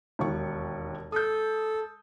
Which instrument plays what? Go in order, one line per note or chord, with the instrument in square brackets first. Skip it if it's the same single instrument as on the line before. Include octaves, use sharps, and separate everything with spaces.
[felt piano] E1 D#2 C#6
[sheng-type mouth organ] A4 [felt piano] D#6 G6